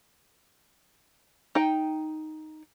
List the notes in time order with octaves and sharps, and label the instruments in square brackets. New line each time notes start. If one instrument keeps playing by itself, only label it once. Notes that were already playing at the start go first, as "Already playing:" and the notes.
[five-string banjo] D#4 G5